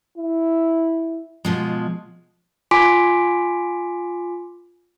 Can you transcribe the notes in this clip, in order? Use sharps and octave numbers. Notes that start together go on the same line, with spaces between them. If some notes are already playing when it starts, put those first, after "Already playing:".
E4
B2 F3 G#3
F4 G#5 C6 D6 B6 D7